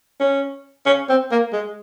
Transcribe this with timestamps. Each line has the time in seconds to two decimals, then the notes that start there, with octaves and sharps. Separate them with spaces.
0.20 C#4
0.86 C#4
1.09 C4
1.31 A#3
1.53 G#3